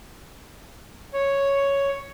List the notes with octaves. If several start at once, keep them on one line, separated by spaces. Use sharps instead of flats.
C#5